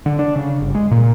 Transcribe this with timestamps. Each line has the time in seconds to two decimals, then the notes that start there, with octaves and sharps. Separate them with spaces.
0.06 D3
0.19 D4
0.36 C#3
0.61 G1
0.75 G#3
0.91 A#2